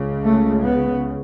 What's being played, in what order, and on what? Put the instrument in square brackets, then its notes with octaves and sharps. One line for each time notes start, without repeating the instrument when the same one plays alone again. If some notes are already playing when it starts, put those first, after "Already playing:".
Already playing: [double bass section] C#2 C#3
A3
B3